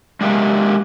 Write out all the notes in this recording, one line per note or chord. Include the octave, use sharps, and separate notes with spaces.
G#3 A#3 D4 G4 E5